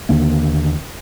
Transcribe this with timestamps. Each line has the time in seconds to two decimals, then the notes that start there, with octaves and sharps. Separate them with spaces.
0.09 D#2 D3 A#3